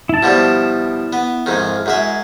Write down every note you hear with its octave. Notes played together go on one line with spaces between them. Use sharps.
E4 A5
B2 F3 G3
B3
F2 G#2 D#3
F#2 G#3 E5